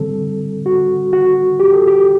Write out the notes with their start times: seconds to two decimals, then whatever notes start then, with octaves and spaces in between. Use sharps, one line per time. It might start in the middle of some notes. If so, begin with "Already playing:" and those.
Already playing: D3 G3 C4 A4
0.66 F#4
1.13 F#4
1.60 G4
1.73 A4
1.87 G4